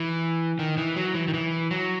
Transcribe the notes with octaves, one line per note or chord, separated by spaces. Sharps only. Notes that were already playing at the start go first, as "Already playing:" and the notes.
Already playing: E3
D#3
E3
F#3
E3
D#3
E3
F#3